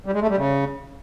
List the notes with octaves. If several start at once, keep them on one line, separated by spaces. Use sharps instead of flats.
G3
G#3
A3
G3
C#3